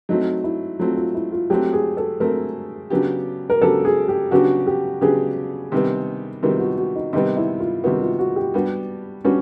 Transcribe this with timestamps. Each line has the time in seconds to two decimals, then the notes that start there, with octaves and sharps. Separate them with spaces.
0.09 F#3 A3 C4 D#4
0.44 E4
0.79 F#3 A3 C4 F4
0.97 F4
1.15 E4
1.32 F4
1.50 F#3 A3 C4 G4
1.73 G#4
1.97 A4
2.20 F#3 A3 C4 A#4
2.90 C#3 F#3 B3 D4 G4
3.50 A#4
3.61 C#3 F#3 B3 D4 G4 A4
3.85 G#4
4.08 G4
4.31 C#3 F#3 B3 D4 F#4 G4
4.67 G4
5.01 C#3 F#3 B3 D4 G4 G#4
5.72 C3 D#3 G3 B3
6.43 C3 D#3 G3 B3 F#4
6.54 F4
6.60 F#4
6.78 F#4
6.96 D#4
7.13 C3 D#3 G3 B3 D#4
7.37 E4
7.60 F4
7.84 C3 D#3 G3 B3 F#4
8.01 F4
8.19 F#4
8.36 G4
8.54 G3 B3 D4 F#4
9.25 G3 B3 C#4 D4 F#4